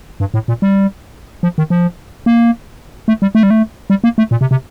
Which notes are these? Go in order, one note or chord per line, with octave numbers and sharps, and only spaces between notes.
G2
A2
A#2
G3
F3
D#3
F3
A#3
A3
G3
A3
G3
A3
G3
A#3
A3
A#2
C3
C3